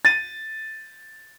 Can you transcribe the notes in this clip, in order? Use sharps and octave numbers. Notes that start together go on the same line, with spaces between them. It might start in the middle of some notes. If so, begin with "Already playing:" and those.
A6 D#7